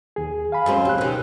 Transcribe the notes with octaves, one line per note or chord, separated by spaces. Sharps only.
D#2 G#4
F5 G#5 B5
F#2 G#3 C4
C#2 C4 G4 F#6
B2 D#3